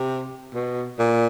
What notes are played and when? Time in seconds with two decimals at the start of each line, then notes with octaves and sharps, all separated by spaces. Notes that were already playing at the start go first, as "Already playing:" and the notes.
Already playing: C3
0.54 B2
0.99 A#2